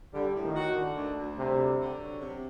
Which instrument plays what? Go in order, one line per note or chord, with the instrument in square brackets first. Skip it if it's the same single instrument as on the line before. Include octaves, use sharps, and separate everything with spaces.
[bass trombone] D3 [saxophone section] G3
[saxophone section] A2
[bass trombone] D#3
[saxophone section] F#4
D3
D2
D2
[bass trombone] C3 [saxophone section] G3
[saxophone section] D3
D3
F#3
C3